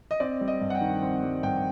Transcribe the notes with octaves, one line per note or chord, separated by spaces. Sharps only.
D#5
C4 D5
G3
D#5
G2
F#5
G5
D#3
C4
G3
G2 G5